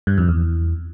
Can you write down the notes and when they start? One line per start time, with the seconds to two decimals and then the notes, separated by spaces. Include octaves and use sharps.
0.07 G2
0.18 F2
0.28 E2